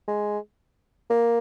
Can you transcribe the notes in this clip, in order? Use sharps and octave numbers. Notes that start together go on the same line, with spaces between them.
G#3
A#3